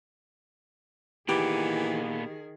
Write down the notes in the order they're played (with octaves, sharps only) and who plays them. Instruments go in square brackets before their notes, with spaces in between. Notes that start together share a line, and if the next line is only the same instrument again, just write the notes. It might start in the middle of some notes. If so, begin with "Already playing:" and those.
[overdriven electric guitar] A#2 B3 [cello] D#3 G#4 [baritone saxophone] E3 [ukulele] G4